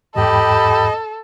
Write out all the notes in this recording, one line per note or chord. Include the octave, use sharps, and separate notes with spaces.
E2 G#2 G4 A4 D#5 B5